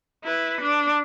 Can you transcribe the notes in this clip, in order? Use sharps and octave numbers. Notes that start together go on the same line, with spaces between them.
E4 B4
D4